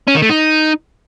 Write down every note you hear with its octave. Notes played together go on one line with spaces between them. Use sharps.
C#4
D#3
A3
D#4